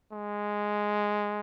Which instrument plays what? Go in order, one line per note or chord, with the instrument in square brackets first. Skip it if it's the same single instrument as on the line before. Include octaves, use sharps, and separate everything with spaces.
[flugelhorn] G#3